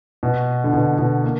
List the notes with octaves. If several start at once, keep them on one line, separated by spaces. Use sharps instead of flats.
B2
D3
B2
B2
A#3